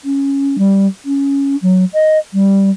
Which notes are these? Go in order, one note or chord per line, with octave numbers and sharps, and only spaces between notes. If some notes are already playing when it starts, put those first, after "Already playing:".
C#4
G3
C#4
F#3
D#5
G3